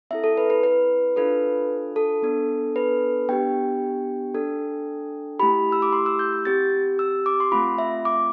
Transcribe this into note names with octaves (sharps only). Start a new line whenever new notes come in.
C4 E4 A4 E5
A4
B4
B4
B4
D4 F4 A4 B4
A4
B3 D4 A4
B4
B3 D4 G4 G5
D4 A4
A3 E4 G4 B5
E6
D6
C6
E6
G6
G6
C4 G4 A6
E6
D6
C6
A3 C4 F4 B5
E5
D6